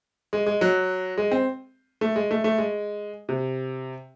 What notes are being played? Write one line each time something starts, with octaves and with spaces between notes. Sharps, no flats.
G#3
G#3
F#3
G#3
C4
A3
G#3
A3
A3
G#3
C3